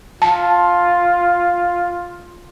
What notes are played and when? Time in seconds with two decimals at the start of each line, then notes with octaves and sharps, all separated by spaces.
0.22 F4 A5